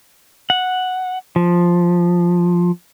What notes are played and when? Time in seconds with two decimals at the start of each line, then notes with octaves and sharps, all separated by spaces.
0.50 F#5
1.36 F3